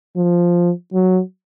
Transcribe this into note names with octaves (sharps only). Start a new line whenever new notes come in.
F3
F#3